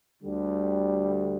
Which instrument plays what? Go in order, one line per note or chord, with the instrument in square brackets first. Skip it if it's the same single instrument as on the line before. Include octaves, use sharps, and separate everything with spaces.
[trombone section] D2 D3 G3